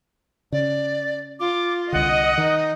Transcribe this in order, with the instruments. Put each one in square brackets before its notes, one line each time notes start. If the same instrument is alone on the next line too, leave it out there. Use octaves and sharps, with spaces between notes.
[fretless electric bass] C#3 [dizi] D5
[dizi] F4 [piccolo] D6
[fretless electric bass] C2 D3 [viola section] D#5 [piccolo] F#5
[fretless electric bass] D#3 [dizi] D#4